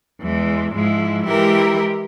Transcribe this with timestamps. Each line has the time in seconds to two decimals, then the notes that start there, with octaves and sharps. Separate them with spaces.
0.21 E2 E3 G#3
0.74 G#2 F3 G#3 E4
1.27 E3 G#3 E4 G4 A#4